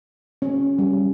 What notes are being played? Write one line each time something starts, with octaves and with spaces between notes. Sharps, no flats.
C#4
G3